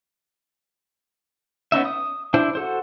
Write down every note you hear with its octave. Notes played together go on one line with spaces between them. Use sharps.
B3 C#4 D#4 E5
D#6
D4 E4 C5
F#4 A4 C5